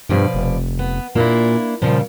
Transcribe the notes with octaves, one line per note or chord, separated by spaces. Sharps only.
G2 B2 F3 D5
F1
B3
A#2 A#3 D4 E4
A#2 C#3 F3 G3